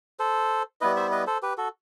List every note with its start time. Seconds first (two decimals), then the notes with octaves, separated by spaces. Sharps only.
0.19 A4 C5
0.81 G3 B3 E4 B4 D#5
0.96 C5 E5
1.12 B4 D#5
1.27 A4 C5
1.43 G4 B4
1.57 F#4 A4